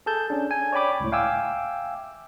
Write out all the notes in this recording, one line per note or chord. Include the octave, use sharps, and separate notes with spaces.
G#4 A4 A5 G6
C#4 D4
G#5
C#5 D5 G5 B5 D6
C#2 A2
E5 F5 G5 G#5 D6 E6